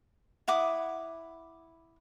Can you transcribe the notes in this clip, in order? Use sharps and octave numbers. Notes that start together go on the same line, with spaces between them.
E4 F#5 D6 D#6